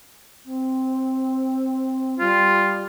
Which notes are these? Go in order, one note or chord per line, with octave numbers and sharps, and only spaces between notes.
C4
G3 F4